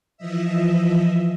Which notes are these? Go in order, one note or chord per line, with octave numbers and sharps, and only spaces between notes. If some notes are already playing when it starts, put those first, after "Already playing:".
E3 F3 D#5 E5